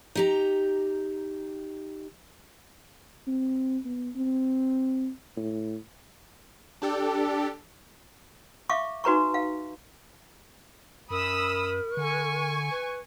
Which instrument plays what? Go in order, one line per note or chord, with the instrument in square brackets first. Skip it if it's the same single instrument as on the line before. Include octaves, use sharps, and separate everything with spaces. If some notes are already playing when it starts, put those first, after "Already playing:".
[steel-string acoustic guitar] D#4 G4 A#5
[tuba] C4
B3
C4
A2
[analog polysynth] D4 G4 A4
[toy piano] E5 F5 C#6 D6
D#4 F#4 B4 A#5 C#6
F5
[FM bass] F#2 [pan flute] A#4 [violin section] B5 D#6 E6
[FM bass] D3 [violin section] G#5 C#6
[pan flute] B4